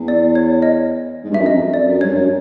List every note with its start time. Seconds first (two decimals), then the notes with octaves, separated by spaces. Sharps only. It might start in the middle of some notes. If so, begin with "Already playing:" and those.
Already playing: E2
0.08 D5
0.35 C#5
0.62 D#5
1.24 G#2
1.31 G2
1.34 F#2 E5
1.46 F2 D#5
1.74 D5
1.87 F#2
2.01 G2 C#5
2.14 F#2